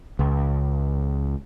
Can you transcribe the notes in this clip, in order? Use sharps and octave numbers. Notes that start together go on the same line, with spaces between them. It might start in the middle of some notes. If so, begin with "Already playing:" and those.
C#2